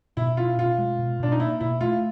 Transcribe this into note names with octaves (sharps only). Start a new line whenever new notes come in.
B2 E4
C#4 F4
B2 F4
G#3
B2
B2 D4
D#4
A#3 E4
B2 E4
A3 F4